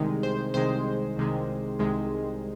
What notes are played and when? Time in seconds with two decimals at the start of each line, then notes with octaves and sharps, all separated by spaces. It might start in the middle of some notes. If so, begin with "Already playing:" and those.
Already playing: C2 C3 D#3 G#3
0.23 C5
0.54 C2 C3 D#3 G#3 C5
1.17 C2 C3 D#3 G#3
1.79 C2 C3 D#3 G#3